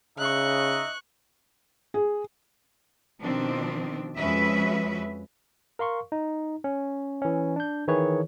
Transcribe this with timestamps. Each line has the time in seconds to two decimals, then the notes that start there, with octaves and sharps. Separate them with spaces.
0.18 C#3 D#4 D#5 E5 C#6 F#6
1.94 G#4
3.21 B2 D#3 F3 C4 D4
4.17 F2 G#3 C#4 F#4 B4 E5
5.79 A#4 F5 C6 C#6
6.12 D#4
6.64 C#4
7.22 E3 C#4
7.56 D4 G6
7.88 D#3 E3 E4 G#4 B4 C#5